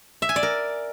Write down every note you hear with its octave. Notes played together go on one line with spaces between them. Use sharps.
E5
G#5
D5
A#4